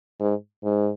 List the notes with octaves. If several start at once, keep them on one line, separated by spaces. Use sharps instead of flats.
G#2
G#2